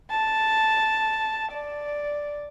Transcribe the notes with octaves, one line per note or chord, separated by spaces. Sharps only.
A5
D5